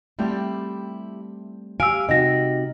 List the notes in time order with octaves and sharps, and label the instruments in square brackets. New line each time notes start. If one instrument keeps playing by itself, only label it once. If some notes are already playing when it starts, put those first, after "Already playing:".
[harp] G3 A3 C4 [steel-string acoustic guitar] E4 G4
[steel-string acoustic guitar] G4 F5 G#5 [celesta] E6 D7 [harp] F6
[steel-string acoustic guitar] C3 D#4 F#4 [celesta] D#5 A#6